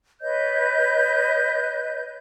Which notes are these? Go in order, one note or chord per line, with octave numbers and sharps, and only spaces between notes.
B4 C#5 D#5 G6